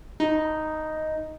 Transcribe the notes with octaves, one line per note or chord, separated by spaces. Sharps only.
D#4